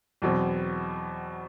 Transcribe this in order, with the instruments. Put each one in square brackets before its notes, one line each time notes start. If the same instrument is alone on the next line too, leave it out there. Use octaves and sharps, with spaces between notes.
[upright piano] E2 B2 F#3 C4